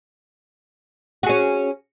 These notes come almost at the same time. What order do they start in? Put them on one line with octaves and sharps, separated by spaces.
F#4 G#4 C#4